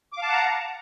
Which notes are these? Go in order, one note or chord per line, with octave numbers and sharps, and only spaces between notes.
F5 F#5 A5 A#5 D6